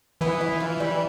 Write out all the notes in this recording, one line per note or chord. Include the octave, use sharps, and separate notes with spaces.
E3 B3
E4
F4
G3